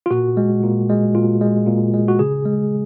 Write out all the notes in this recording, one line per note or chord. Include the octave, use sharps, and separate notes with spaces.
F4
A#2 F#4
G#3
A#2
G#3
A#2 F4
G#3
A#2
G#3
F#4
C#3 G#4
G#3